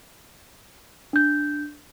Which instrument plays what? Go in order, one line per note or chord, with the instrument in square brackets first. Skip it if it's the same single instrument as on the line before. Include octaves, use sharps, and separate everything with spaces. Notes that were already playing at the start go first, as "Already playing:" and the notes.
[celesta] D4 G6